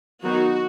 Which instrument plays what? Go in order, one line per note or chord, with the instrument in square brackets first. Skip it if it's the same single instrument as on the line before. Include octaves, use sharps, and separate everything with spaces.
[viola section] D#3 F#3 B3 D#4 F#4